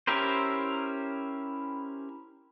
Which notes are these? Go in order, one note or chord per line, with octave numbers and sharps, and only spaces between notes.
C#4 E4 G4 A#4 C5